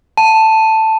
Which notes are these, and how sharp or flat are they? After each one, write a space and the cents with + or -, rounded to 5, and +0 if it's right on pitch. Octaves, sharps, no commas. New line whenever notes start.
A5 +5